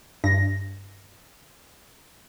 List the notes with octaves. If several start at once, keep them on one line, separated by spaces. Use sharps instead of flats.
G2 A#6